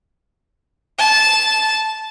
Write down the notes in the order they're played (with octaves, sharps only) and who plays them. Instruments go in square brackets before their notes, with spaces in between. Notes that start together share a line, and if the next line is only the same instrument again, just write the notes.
[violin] A5